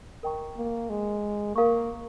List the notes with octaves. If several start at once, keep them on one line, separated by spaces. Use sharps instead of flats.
A#4 D#5 G5 A#5 C#6
A#3
G#3
A#3 A#4 F5 A#5 C#6